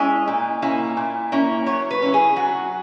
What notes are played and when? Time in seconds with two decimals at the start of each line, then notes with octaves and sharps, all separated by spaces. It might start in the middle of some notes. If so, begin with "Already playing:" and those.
Already playing: G#3 C#4 E4 D#5
0.28 A#2
0.62 A#3 C#4 E4
0.97 A#2
1.32 A#3 C#4 E4
1.66 F#3 C#5
1.91 B4
2.02 C#4 E4
2.14 G#4
2.36 F#3 F#4